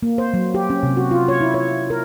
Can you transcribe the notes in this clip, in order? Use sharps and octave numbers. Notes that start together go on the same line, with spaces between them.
A#3
C5
F#3
G4
C#4
C3
F#4
F4
C#5
E4
C#5
A#4